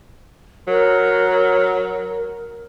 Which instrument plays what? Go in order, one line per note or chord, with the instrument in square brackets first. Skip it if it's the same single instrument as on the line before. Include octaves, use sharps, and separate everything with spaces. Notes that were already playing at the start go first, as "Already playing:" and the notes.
[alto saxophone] F#3 [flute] A#4